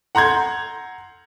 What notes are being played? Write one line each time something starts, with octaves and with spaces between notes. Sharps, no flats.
F#5 A#5 C6 G6 G#6